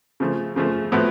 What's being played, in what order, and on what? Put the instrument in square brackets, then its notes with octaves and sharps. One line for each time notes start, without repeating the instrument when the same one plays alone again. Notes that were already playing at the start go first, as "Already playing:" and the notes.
[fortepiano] C#3 F3 A3
C#3 F3 A3
A2 F3 B3 F#4